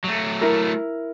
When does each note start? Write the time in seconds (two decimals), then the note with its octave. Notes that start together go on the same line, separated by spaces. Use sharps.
0.05 F#3 A3
0.41 E4 A#4